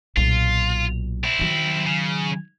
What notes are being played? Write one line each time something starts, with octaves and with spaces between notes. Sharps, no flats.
B1 A#2 F4
C4 E4
D#3 F#3
C#3